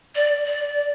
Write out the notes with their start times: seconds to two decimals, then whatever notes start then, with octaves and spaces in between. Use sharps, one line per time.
0.15 D5
0.46 D5